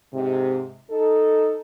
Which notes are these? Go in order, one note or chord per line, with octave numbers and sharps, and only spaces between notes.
G#2 C3
D#4 A4